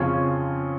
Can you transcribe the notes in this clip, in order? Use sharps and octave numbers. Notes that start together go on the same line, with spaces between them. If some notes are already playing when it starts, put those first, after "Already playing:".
Already playing: F2 C#3 C#4 F4